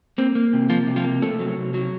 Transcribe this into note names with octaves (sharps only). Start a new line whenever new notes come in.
A#3 C4
A#3
C3
F3 A#3 F4
C3
F3 F4
A#3
C3 A3 A4
F#3
C3
F#3